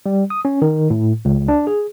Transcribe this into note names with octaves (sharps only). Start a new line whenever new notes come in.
G3
D#6
C#4
D#3
A2
C#2
D4
G#4